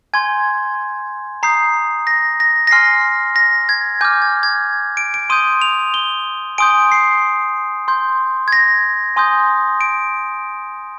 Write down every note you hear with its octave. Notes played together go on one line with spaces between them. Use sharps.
G#5 C6 G6 G#6
A#5 D#6 G6 C7
A#6
A#6
A#6
G#5 C6 F6 C7
A#6
G#6
G#5 D6 F6 G6
G#6
G#6
D7
D7
C6 D#6 G6 D#7
F7
G7
G#5 C6 D#6 G6 D7
C7
C6 G6
G#6
A#6
G#5 C6 D#6 G6
D7